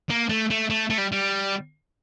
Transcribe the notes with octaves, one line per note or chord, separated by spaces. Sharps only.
A#3
A3
A3
A3
A3
G3
G3